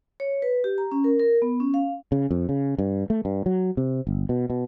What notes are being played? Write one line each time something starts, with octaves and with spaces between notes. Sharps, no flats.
C#5
B4
G4
A#5
C#4
A#4
A#4
B3
C#4
F5
C#3
F2
C#3
G2
A3
G2
F#3
C3
G1
B2
B2